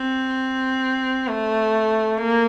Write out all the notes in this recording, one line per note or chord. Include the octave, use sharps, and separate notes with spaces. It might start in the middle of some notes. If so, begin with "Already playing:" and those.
Already playing: C4
A3
A#3